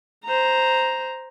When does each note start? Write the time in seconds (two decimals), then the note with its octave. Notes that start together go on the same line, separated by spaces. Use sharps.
0.25 C5 A#5